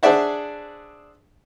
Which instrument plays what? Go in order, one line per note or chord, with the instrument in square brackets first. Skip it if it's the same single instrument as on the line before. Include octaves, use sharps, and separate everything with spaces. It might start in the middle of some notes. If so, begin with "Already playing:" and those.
[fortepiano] D4 G#4 C5 D5 E5 F#5